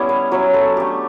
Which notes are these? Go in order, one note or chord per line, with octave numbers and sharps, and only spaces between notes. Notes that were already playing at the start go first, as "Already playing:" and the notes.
Already playing: G3 B3 C#4 E4 C#5
B4
F#3 C#4 E4 B4
A4
A3 D4 G4